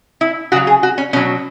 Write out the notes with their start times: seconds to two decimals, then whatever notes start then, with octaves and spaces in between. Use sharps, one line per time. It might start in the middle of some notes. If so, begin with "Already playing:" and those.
0.21 E4
0.52 C#3 F#3 F#4
0.67 G#4
0.83 F#4
0.98 C#4
1.13 B2 F#3 C#4